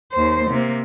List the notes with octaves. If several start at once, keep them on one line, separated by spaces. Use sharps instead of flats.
D#2 C5
C3 A#3